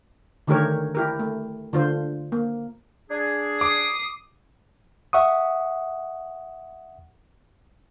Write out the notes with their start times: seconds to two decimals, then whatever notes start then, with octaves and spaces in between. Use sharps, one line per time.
0.47 D3 D#3 A3 G4 A#4 C#5
0.95 E4 G4 A#4
1.20 A3
1.73 D3 F4 C5
2.32 A#3
3.10 D4 G#4
3.61 D6 D#6 C7
5.13 E5 F#5 C#6 D#6